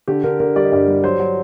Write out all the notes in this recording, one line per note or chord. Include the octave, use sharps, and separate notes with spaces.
D3 G4
D3 A#4
D3 A#4
G3 D5
D#5
G2 D5
G3
F#3 C5
F#3